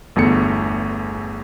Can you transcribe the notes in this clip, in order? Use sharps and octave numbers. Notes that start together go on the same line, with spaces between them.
G1 E2 A3 C#7